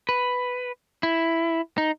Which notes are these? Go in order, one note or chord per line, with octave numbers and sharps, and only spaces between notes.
B4
E4
D#4